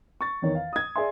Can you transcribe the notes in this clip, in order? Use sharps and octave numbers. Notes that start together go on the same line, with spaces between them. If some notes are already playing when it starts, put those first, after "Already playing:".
C#6 A6
E2 D#3 C#5
F5
D#6 G#6
G#4 D5 E5 C6